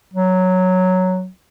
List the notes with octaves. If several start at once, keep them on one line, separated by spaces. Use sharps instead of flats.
F#3